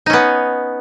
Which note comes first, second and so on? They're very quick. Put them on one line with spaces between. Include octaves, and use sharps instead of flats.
D#4 C#4 B3